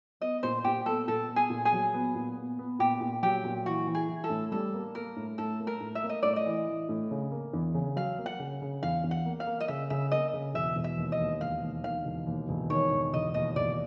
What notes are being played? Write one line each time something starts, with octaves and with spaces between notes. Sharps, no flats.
B3 D#5
A#2 C5
A#2 G4
B3 A4
A#2 A4
B3
G#4
A#2
G#4
F#3
B3
A#2
B3
B3
A#2 G4
A#2
F#3 G4
A#2
E3 F#4
E3
G#4
E3
A4
A2
G3 A4
A#3
A#3 A#4
A2
A2 A4
A#3
A#4
A2
E5
A#3
D#5
A2 D5
D#5
E3
E3
A2
C#3
A#3
E2
C#3
F#3 F5
A#3
F#5
C#3
C#3
E2 F5
E2
F#5
A#3
F5
A#3
D#5
C#3 E5
C#3 E5
A#3 D#5
C#3
E1 E5
E1
E5
D#2
D#5
D#2
E1 F5
D#2
D#3 F5
E1
D#2
E1
D#3 C#5
E1
E1 D#5
D#2 D#5
E1 D5